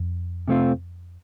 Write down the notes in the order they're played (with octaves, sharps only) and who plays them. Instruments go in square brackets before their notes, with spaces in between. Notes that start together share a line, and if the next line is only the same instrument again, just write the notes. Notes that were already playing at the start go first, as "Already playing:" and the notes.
Already playing: [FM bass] F2
[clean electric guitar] C3 A3 C4 F4